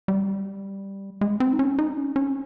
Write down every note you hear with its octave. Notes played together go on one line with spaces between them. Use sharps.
G3
G#3
C4
D#4
C#4
D#4
C#4
C#4